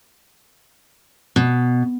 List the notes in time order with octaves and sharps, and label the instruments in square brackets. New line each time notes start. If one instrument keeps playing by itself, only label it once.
[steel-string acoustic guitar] B2